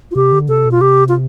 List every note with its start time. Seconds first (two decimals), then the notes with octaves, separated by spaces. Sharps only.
0.11 F4
0.16 C3 G4
0.32 D3
0.49 C3 A4
0.65 B2
0.71 F4
0.81 C3 G4
1.09 F4